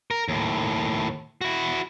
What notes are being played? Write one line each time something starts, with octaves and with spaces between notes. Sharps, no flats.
A#4
D#2 A2
E4 F#4